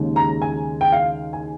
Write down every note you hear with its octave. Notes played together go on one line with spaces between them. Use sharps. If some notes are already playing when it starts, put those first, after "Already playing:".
Already playing: D#2 C#3 G#3
A#5
G#5
G5
F5
G#5